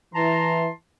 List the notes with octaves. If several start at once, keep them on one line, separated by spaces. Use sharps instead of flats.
E3 A5 A#5 C6